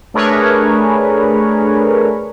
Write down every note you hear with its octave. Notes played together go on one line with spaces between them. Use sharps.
A3 D4 G#4 A#4 B4 C#5